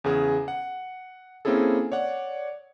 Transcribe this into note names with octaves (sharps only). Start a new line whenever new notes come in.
E2 C#3 G#4
F#5
A#3 C4 C#4 E4 G#4 A4
C#5 D5 F#5